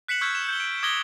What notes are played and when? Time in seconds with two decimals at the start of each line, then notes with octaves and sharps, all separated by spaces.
0.08 F#6 B6 C#7 E7 F#7
0.21 C#6 E6 F6 G6 G#6 B6
0.35 E7
0.49 G6 C#7 G7
0.60 D7
0.83 D6 D#6 G#6 A#6 F#7 G7